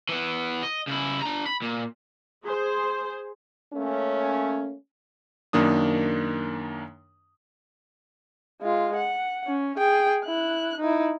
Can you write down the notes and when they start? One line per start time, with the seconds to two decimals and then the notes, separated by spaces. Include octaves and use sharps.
0.09 E3 B3
0.63 D#5
0.88 C#3 E4
1.22 D4 A#5
1.46 B5
1.62 A#2
2.44 G#4 C5
3.73 A3 A#3 C#4
5.53 F#2 D#3 A#3 D4 D#6
8.61 G#3 F4
8.96 F#5
9.47 C#4
9.77 G#4 G5
10.25 E4 F#6
10.80 D#4 E4